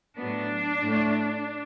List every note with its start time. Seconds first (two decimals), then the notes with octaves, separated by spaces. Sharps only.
0.18 A2 F#3 B3 D4
0.85 A2 A3